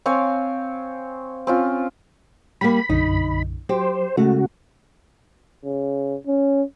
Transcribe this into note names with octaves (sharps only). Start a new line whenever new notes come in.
C4 C#5 F5 G#5
C4 C#4 F4
G3 A#3 B5
B1 F#2 D3 D#4
F#3 G4 C5
C#3 G#3 A3 F#4
C#3
C#4